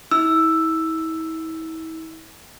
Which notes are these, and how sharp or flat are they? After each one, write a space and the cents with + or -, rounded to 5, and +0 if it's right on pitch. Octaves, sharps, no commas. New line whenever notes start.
E4 -40 E6 +5